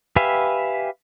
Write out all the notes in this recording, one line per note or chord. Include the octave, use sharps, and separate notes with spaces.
G4 B4 E5 F5 G#5